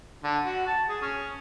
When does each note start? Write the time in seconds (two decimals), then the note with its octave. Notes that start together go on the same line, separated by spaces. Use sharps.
0.24 D3
0.44 F#4
0.67 A5
0.89 G#4
1.02 C#4